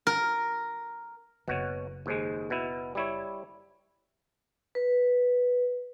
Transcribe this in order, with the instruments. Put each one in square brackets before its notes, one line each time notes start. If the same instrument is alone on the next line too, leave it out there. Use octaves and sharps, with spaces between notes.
[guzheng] A#4
[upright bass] F#1 [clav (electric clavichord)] B2 F#4 C#5
[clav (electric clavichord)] D#2 G#2 G#3
B2 E4
G3 E4 C#5
[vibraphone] B4